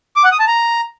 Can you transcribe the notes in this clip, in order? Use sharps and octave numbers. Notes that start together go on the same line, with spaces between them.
D6
F#5
D#6
A5
A#5